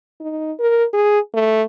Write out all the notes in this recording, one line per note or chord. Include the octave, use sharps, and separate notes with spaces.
D#4
A#4
G#4
A3